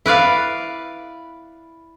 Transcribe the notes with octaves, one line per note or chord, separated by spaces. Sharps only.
E4 B4 D5 F5